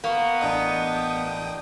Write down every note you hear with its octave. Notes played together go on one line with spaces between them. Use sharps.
A#3 B3 C#6
A1 D4 D#5 G5 D#6